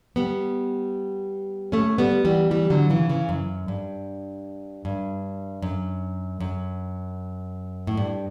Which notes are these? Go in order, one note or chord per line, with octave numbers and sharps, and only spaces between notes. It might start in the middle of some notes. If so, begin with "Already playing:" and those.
G3 B3
A3 C#4
G3 B3
E3 G3
E3 G3
D3 F#3
C#3 E3
C#3 E3
F#2
G2
G2
F#2
F#2
A2
G2